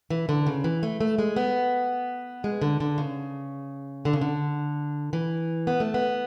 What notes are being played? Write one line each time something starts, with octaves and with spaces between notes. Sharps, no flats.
E3
D3
C#3
E3
A3
A3
G#3
B3
G#3
D3
D3
C#3
D3
C#3
D3
E3
B3
A3
B3